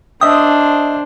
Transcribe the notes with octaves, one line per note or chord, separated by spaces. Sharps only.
D4 C5 D#5 E5 G5 D#6